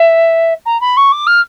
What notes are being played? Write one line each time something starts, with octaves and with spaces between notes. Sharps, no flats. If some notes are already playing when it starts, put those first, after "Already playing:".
Already playing: E5
A#5
B5
C#6
D6
F6